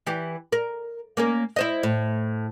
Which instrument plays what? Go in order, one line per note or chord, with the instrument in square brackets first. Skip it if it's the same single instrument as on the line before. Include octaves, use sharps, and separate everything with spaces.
[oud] E3 G4
A#4
A#3 C#4 A#4
E4 C5 D#5
A2